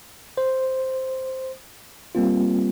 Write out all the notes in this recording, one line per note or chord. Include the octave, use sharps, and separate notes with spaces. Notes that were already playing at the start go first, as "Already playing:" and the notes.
C5
G3 A#3 C4 F4